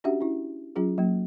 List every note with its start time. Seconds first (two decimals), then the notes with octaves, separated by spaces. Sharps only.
0.04 C#4 D4 F#4 G4 E5 F#5
0.21 C#4 E4
0.76 F#3 C#4 F4 G#4
0.98 F#3 A#3